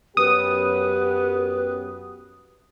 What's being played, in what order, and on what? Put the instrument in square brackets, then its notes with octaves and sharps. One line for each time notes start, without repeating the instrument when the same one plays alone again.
[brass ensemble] F#2 B3 G4 [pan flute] B4 [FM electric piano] D#6